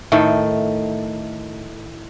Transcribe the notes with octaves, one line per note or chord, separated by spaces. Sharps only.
A2 D#3 A3